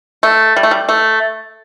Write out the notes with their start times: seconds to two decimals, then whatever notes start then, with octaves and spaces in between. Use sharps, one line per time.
0.23 A3
0.57 G3
0.63 A3
0.71 G3
0.89 A3